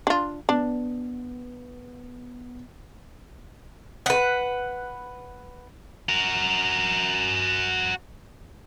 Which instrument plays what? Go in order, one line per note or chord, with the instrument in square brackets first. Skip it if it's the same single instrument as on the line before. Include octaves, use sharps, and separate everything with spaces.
[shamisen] D4 F4
[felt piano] B3 [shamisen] D4
[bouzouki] B4 F#5
[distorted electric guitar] F#4 A#4